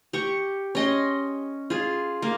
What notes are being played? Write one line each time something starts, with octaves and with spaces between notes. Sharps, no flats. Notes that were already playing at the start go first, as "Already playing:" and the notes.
G4 C#6
C#4 D#5 C6
F4 G#4
A#3